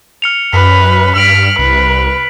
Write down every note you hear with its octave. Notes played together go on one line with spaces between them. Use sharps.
F6 C#7 F7
F#2 B4 B6
G2 F6 B6 D7 F#7
C2 B4